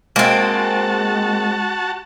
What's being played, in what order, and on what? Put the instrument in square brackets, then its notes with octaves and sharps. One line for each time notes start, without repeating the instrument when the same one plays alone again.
[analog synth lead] G#3 [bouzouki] A#3 C4 [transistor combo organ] F#4 A5